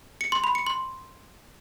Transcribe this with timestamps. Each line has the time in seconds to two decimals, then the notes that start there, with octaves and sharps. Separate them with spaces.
0.21 C#7
0.32 C6
0.44 B5
0.55 C#7
0.67 C6